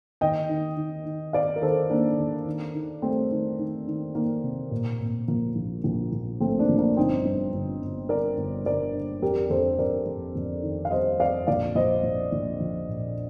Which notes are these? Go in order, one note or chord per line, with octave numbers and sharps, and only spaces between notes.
D#2 D#5 G5
D#3
D#3
D#3
D#3 D5 F5
A#4
D#2 A4 C5
D#3 A#3 D4
D#2
D#3
D#3
G3 A3 C4
D#3
D#3
D#3
D#3 A#3
C3
A#2
A#2
F3 A#3
A#1
A#1
A#1
A#1 A3 C4
A#3 D4
F3
A#3 D4
G1 C4 D#4
G2
G1
G1
D3 A#4 D5
G1
G1 A#4 D5
D3
F2 G4 A#4
F2 A4 C5
F2 A#4 D5
F2
F2
D#3
F5
G3 C5 D#5
F2 D5 F5
A#1 D5 F5
A#1 C5 D#5
A#1
A#1
F3
A#2